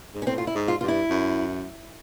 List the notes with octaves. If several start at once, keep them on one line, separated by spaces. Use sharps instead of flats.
G#2
C#4
A2 C4
F4
E4
G#2
F4
G2 F4
E4
F#2